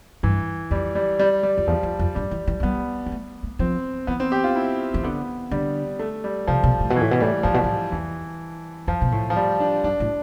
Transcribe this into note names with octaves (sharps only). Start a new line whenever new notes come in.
G2 E3
F2 G3
G3
G3
G3
F2
E2 F3
F2
F2
G2 G3
E3
E3
F3
G3 B3
B3
A3
A3
F3 C4
E3 B3
C4
G4
F4
E4
E3
D3 B3
D3 G3
A3
G3
C3 F3
B2
A2
B2
E3
A2
B2
A2 G3
A2 F3
B2
A2
E2 E3
F2 F3
B2
A2
F3
G3
D4
G2 D4
A2